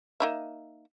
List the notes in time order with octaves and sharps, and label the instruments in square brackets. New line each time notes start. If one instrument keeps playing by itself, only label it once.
[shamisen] A#3 D#4 E5